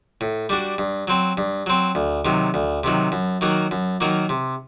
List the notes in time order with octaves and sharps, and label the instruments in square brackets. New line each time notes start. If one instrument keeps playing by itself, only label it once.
[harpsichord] A2
G3 D4 F#4
G2
F#3 C4
G2
F#3 C4
D2
C3 D#3 F#3
D2
C3 D#3 F#3
F#2
D#3 F#3 A#3 F#4
F#2
D#3 F#3 A#3 F#4
C3